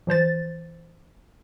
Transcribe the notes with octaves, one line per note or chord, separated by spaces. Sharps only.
E3 F3 C5 A6